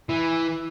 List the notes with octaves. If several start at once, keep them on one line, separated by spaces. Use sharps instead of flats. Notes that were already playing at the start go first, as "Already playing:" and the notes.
E3